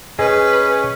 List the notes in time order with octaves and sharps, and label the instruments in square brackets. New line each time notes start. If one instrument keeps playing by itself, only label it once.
[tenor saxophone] C#4 [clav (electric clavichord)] G#4 D#5 [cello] B4